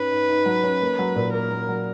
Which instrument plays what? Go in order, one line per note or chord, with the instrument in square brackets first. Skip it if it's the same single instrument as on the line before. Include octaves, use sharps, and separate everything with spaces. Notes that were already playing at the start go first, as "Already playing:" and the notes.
Already playing: [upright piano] G#2 C#4 [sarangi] B4
[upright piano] G#2
G#2
F#3
C#4
A#3
F#3
A#2
[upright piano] A#3 [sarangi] A#4
[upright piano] A#3
F#3